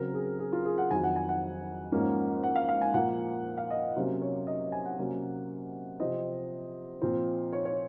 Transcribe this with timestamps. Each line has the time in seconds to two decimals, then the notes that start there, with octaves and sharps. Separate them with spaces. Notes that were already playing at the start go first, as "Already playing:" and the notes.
Already playing: C#3 F#3 C4 A#4
0.14 G#4
0.39 G#4
0.53 F4
0.65 G#4
0.78 F#5
0.90 F2 D#3 F#3 G#5
1.04 F#5
1.16 G#5
1.29 F#5
1.92 G#2 F3 A#3 C#4
2.43 F#5
2.55 F5
2.69 F5
2.81 G#5
2.94 A#2 F3 A#3 F#5
3.57 F5
3.70 D#5
3.96 C3 F#3 A#3 C#4 C5
4.22 C#5
4.47 D#5
4.72 G#5
4.85 F#5
4.98 C3 F#3 A#3 C#4
6.00 C3 F3 C4 D#5
7.02 A#2 F3 C4
7.53 C#5
7.65 C#5